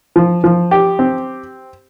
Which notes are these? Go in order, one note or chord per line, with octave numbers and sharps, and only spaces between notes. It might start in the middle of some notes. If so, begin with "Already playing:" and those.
F3
F3
G4
C4